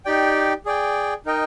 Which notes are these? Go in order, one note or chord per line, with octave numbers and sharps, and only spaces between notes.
D#4 G4 D5 G5
G#4 D5 G5
D#4 A#4 D#5 G5